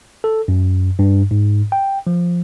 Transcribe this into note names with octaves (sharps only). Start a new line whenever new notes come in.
A4
F#2
G2
G#2
G5
F3